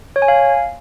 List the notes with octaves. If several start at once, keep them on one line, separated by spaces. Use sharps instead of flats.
C#5
G#5
F5